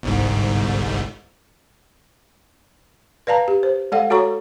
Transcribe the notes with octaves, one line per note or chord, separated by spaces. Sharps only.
G1 C2 G#2
B4 D5 F5 A5 A#5
G4
C5
G#3 A4 D5 F5 F#5
F#4 A4 C#5 A#5 C#6